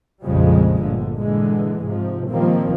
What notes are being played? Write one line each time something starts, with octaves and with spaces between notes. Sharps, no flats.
A#1 F2 C#3 F3 G3 G#3
G1 A#2 D3
A#2 D3 E3 G#3
G#2 C3 F3
A#2 D#3 F3 G3 A#3 C4